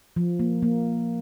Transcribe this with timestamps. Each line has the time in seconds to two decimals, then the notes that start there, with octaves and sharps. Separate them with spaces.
0.16 F3
0.39 A#3
0.62 A#3